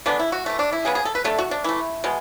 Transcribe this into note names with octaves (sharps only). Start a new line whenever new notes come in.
D3 G#3 B3 D4
E4
F#4
E3 A3
D4
E4
C#3 G#3 B3 G#4
G#4
A4
B4
D3 A3 A4
F#4
D4
E3 A3 E4
B2 G#3